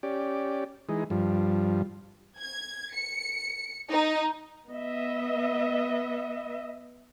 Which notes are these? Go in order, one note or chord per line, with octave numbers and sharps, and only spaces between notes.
C#4 G4 D5
E3 G#3 D#4
G2 F3
G#6
C#7
D#4
B3 D#5 E5